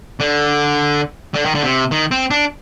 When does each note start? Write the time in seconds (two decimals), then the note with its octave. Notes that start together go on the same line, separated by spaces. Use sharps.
0.20 D3
1.34 D3
1.45 D#3
1.55 D3
1.63 C3
1.91 D#3
2.11 C4
2.31 D4